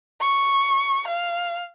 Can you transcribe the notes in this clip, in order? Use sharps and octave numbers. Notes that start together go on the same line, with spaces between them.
C#6
F5